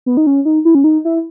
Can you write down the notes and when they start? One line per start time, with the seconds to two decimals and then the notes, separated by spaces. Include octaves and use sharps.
0.06 B3
0.17 D#4
0.27 C#4
0.45 D#4
0.65 E4
0.75 C#4
0.84 D#4
1.05 E4